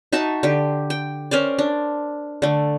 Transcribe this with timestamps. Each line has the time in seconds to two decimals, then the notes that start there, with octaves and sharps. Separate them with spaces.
0.12 D#4 F#4 E5 A5
0.43 D3 G4
0.90 G5
1.31 C#4 A#4 C5 D5
1.58 D4
2.42 D3 A3